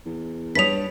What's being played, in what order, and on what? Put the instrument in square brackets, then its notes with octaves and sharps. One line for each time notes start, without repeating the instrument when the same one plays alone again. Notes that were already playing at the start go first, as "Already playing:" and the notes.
[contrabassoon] E2
[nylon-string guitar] G3 D4 [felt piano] B4 C#5 D#6 [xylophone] B6 F7